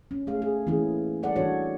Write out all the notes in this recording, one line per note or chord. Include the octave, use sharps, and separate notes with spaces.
C#4
A3 G#4 F5
G#4
E3 A3 A#3 C#4 E4 G#4
G3 A4 D5 F#5
E3 D4 F#4 A4 C#5